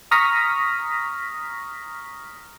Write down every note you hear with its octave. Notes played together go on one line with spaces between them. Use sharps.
A#5 C#6 D#6 F6 A#6 B6